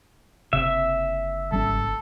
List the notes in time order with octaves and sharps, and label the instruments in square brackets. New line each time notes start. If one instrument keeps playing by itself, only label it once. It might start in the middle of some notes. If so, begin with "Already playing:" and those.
[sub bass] F#1 [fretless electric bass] C3 [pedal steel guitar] E5
[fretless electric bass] G#1 G3 C#4 [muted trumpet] A4